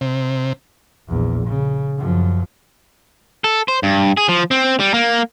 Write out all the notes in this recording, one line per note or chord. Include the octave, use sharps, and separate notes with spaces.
C3
A#1 E2
C#3
F#2 F3
A4
C5
G2
G#4
F3
C4
G3
A#3